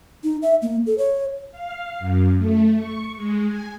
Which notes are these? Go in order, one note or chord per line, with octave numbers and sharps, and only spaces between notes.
D#4
E5
A#3
A4
C#5
F5
F#2
A3
C#6
G#3
G#5